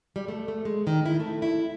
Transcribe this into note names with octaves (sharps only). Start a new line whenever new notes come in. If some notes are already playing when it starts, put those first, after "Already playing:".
G3
A3
A3
G#3
D#3
E4
A3
E4